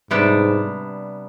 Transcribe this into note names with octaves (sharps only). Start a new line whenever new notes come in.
G#2 C3 G3 B3 D4